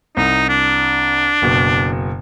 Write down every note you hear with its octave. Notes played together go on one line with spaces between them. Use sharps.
C2 D#4
D4
F#1 B2